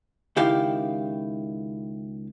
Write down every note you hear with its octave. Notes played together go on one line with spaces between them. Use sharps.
C#2 D#3 E4 G4 F5